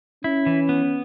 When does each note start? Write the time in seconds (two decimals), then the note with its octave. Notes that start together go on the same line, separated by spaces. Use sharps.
0.24 C#4 E4
0.46 E3
0.69 B3